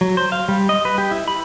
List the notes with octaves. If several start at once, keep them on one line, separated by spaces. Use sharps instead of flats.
F#3
C5
F5
G3
D#5
B4
G4
E4
B5